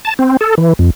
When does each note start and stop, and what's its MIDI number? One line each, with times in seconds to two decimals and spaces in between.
0.05 0.14 81
0.19 0.37 60
0.41 0.55 69
0.58 0.73 52
0.79 0.90 41